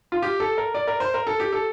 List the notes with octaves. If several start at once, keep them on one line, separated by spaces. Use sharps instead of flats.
F4
G4
A4
A#4
D5
A#4
C5
A#4
A4
G4
A4